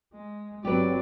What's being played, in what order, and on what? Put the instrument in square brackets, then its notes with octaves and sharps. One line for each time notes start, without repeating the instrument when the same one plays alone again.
[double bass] G#3
[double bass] G1 C4 [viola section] F#3 [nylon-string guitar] G4 B4 [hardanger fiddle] D5